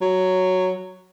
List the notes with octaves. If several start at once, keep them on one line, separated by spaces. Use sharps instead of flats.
F#3